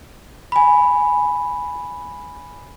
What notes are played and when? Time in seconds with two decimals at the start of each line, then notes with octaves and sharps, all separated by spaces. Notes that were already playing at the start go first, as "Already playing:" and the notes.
0.52 G#5 B5